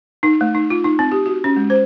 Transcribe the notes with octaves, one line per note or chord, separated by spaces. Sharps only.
D#4
A3
D#4
F4
D#4
C4
G4
F#4
C#4
G#3
C5